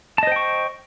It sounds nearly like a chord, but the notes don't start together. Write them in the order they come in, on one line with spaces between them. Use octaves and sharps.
A5 D#5 C5 G5 C#6